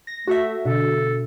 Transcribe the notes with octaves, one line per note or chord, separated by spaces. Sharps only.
A#6
A3 F#4 A4 E5
B2 D3 A4